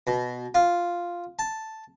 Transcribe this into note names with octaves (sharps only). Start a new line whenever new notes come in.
B2
F4
A5